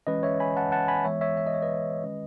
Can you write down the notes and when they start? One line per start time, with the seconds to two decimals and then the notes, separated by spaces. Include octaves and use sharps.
0.07 E3 G#3 C#4 B4 D#5
0.23 C#5 E5
0.40 G#5 B5
0.57 F#5 A5
0.72 F#5 A5
0.88 G#5 B5
1.05 E3 G#3 B3 C#5 E5
1.21 C#5 E5
1.37 E5
1.47 D#5
1.54 C#5
1.62 B4 D#5
2.04 D#3 G#3 C#4